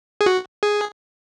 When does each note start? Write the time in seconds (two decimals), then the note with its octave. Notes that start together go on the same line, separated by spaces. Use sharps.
0.21 G#4
0.26 F#4
0.63 G#4